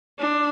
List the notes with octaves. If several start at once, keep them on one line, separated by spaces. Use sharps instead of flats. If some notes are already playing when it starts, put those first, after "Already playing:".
D4